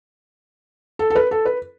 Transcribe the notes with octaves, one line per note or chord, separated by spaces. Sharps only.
A4
A4
B4
A4
B4